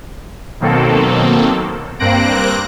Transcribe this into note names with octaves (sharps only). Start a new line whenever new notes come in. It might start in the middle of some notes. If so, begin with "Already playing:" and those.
B2 D#3 F#3 A#3 C4 A4
G2 A#3 C4 F#6 A#6 D7